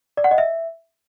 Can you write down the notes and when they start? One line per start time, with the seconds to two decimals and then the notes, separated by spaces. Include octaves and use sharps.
0.17 D5
0.24 F#5
0.31 D#5
0.38 E5